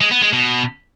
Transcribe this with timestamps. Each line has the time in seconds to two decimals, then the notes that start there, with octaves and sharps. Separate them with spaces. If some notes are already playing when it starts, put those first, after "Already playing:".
0.01 G#3
0.12 B3
0.22 G#3
0.33 B2